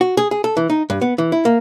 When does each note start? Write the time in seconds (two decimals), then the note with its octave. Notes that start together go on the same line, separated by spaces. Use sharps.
0.01 F#4
0.17 G#4
0.31 G#4
0.44 A4
0.57 E3
0.70 D#4
0.90 G2
1.01 B3
1.18 E3
1.32 E4
1.45 A#3